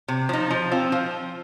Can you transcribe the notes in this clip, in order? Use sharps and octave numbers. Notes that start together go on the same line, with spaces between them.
C3
F3 D#4
F3
C4 F4
F3